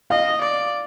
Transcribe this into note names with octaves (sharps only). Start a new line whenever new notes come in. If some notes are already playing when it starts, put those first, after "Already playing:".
D#5 F5
D5